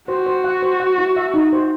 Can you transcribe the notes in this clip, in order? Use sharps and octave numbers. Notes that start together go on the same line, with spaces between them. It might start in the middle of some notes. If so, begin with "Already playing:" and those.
F#4 C5
C5
F#5
C5
F#5
E4
E5
D#4
C5